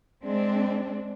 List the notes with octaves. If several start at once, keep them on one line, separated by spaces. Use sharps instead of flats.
G#3 C4 D4